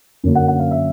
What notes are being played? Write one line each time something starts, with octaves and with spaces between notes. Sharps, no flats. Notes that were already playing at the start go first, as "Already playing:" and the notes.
F#2 D3 F#3 A#3 C#4
F#5
F#5
F5
E5